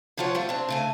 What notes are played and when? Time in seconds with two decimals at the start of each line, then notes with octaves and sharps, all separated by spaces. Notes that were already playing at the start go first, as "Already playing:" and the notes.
0.17 A#2 F3 F4 C#5 F#5
0.35 G3 A3 F4
0.49 C4 D4
0.69 C#3 A3 G#5